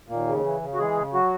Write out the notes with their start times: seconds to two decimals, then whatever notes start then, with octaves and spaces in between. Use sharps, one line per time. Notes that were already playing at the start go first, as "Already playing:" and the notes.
0.08 D#2 A#2 A#3
0.27 C#3
0.43 E3
0.61 C#3
0.74 F#4
0.78 E3 G#3 G#4
0.97 C#3
1.14 F#3 F#4